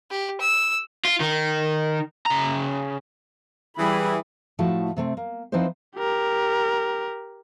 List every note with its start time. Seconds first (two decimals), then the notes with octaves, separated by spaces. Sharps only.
0.10 G4
0.40 E6
1.05 F4
1.20 D#3
2.26 C#3 A#5
3.77 E3 G3 G#4 B5
4.59 A2 F3 A3 E4 F#4 A5
4.97 C3 A3 C4
5.17 A#3
5.52 F3 C4 D#4 E4 B4 C5
5.96 G4 A#4